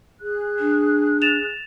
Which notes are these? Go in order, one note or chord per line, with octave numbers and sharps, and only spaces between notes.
G#4 F#6
D4
A6 E7 F7